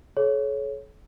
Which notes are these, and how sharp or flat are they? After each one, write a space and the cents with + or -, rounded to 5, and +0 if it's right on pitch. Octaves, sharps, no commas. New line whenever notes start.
A4 -45 C#5 +0